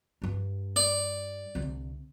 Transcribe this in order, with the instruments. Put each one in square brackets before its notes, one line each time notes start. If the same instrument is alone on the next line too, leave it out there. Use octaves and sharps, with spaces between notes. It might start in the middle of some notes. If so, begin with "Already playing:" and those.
[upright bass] G2 G3
[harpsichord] D5
[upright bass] C2 D3